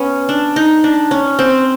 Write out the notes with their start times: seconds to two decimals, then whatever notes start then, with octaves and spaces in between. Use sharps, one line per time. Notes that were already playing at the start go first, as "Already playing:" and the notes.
Already playing: B3 C#4
0.29 D4
0.56 D#4
0.84 D4
1.11 C#4
1.39 C4